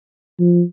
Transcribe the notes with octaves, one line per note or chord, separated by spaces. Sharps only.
F3